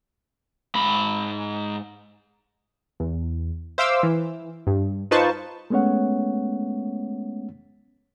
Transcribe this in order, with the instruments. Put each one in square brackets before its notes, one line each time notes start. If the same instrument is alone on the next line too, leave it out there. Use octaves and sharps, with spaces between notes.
[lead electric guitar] G#2 B5
[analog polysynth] E2
C5 E5 F5 C6 D6 E6
E3
G2
D#4 F4 B4 C5 A5 C#6
[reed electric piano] G#3 A3 B3 C#4 C#5 F#5